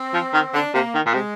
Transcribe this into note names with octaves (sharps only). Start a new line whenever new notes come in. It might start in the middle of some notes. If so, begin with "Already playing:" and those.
Already playing: C4
F3
D#3
D3 D4
C3 A#3
D#3
A#2
C3 G#3